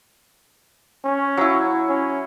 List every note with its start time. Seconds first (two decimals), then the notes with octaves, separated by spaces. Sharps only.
1.05 C#4
1.37 F#3 E4
1.89 C#4